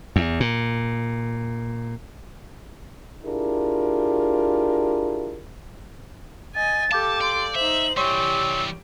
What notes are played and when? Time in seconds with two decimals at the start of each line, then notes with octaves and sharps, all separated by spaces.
0.16 E2
0.40 A#2
3.24 D4 E4 F4 G4 G#4 A#4
6.55 D#5 G#5 A6
6.92 G4 A4 F5 A5 D6 G6
7.21 D5 C6
7.56 D#4 C5 E5 F#7
7.97 E3 G3 G4 C#5 C6 C#6 E6